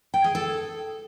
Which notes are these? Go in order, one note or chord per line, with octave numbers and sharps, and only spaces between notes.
G5
G#4
A4